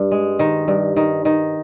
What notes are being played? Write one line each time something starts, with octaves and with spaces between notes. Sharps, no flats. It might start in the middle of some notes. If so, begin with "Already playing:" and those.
Already playing: G2
G#3
D#3
G2
D#3
D#3